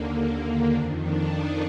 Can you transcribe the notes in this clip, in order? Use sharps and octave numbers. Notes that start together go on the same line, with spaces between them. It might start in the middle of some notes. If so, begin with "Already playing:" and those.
Already playing: D#2 D3 A#3
F2 D#3 D4
D4
D#4